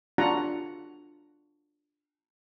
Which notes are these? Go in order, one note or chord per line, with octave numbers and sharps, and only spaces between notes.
D4 F4 F#4 F#5 A#5